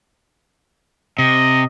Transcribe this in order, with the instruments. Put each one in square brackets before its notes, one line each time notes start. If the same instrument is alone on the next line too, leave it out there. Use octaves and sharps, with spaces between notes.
[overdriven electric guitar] C3 [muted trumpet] D#5